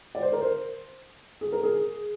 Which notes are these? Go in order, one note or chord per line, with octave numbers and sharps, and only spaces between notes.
D5
C5
A#4
C5
G#4
A#4
G#4